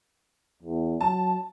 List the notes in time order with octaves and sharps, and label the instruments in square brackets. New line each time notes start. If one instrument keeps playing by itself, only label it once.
[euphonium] E2
[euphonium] F#3 [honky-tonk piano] A5